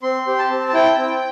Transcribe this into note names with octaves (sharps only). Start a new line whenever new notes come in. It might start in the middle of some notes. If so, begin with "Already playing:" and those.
C4 C6
G4
A5
C4
A5
E4 G5
C4